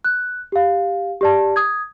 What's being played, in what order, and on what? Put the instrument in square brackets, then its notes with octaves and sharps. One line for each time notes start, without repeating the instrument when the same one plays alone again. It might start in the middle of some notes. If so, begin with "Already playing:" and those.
[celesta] F#6
G4 F5
G4 D5 A5
D#6 G#6